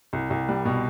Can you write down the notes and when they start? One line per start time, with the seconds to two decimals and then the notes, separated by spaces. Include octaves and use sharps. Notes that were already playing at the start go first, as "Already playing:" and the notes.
0.13 C2
0.30 C2
0.49 G3
0.65 B2